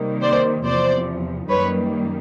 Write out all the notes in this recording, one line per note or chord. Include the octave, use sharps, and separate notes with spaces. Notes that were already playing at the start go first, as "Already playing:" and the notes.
Already playing: C3 D#3 G3 A#3
C5 D5
E2 C3 F3 C5 D5
F#2 D#3 G3 A#3 B4 C#5